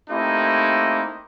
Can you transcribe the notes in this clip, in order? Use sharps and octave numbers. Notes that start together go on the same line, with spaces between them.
A3 A#3 C4 D#4 E4 G4